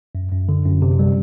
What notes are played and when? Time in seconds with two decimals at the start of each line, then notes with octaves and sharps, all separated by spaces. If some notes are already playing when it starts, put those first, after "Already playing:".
0.15 F#2
0.32 F#2
0.49 D3
0.66 F#2
0.82 C3
0.99 G3